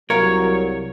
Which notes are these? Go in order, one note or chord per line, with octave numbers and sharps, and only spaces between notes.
C2 F#3 A#4 C#5 F5